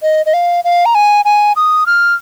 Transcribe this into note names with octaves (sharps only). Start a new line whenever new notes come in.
D#5
D#5
F5
F5
A#5
G#5
G#5
D#6
F6